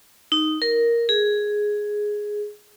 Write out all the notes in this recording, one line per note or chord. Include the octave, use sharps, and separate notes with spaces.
D#4
A#4
G#4